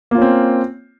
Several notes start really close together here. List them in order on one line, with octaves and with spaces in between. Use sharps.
A#3 F4 C#4 C4